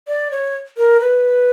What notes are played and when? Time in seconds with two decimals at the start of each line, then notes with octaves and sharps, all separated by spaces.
0.08 D5
0.31 C#5
0.77 A#4
1.00 B4